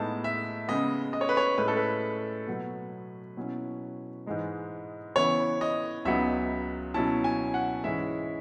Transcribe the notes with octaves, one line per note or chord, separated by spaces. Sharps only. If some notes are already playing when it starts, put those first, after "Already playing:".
Already playing: A2 G#3 B3 D#4 A5
E5
C#3 G#3 B3 D#5
D#5
C#5
B4
C#5
A2 G#3 C#4 B4
A4
B4
B2 F#3 B3
B2 F#3 C#4 E4
G#2 E3 G#3 D#4
C#3 E3 B3 E4 C#5
D#5
C#2 C#3 F#3 B3 D#4 E5
B2 F#3 C#4 E4 A5
G#5
F#5
G#2 E3 G#3 C#4 E4 E5